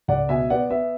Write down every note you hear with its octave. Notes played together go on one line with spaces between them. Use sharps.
C#2 D5 F#5
B2 E5 G#5
B3 D5 F#5
B3 E5